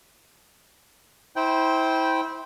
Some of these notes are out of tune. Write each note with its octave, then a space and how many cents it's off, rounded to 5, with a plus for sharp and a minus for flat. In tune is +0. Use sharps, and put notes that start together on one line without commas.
E4 -25 C5 +0 G5 -5